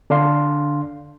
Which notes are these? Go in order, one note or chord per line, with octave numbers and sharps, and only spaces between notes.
D3 D4 F5 C6